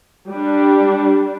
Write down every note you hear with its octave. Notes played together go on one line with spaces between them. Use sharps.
G3 D4